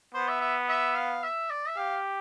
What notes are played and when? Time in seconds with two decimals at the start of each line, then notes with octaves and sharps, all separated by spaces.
0.14 B3 C5
0.28 E5
0.41 E5
0.68 E5
0.96 F5
1.23 E5
1.50 D5
1.68 E5
1.77 G4 F5